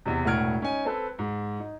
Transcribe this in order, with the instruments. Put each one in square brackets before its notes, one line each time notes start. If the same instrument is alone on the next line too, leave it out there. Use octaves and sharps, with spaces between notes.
[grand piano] E2 C3
E1 A2 F#5 F6 G#6 D7
C#4 D#4 G#5
C4 A4 B4
G#2
D#4